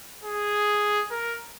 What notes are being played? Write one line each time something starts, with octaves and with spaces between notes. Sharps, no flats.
G#4
A#4